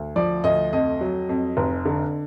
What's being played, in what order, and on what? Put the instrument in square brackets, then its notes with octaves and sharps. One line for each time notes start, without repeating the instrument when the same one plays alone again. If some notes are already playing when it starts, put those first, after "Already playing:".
Already playing: [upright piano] D2
F3 D5
D2 D#5
F2 D#5
F#3
F2
F1
D3